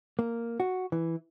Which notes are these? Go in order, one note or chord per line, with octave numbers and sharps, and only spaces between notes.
A#3
F#4
E3